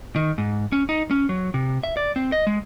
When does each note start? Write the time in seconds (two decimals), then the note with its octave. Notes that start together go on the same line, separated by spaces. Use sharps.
0.16 D#3
0.38 G#2
0.72 C#4
0.89 D#4
1.11 C#4
1.29 F#3
1.54 C3
1.83 E5
1.97 D5
2.16 C4
2.32 D#5
2.47 G#3